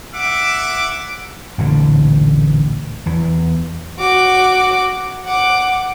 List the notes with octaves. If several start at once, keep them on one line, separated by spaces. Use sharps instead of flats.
E5 F#5 D6
A1 D2 A#2 D3
E2 E3
F#4 D6
F#5 D6